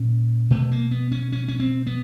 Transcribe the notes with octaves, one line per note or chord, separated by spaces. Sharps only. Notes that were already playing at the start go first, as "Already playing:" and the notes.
Already playing: A#2 C#4
B2 A3
A#3
B3
C#4
C#4
C#4
C4
B3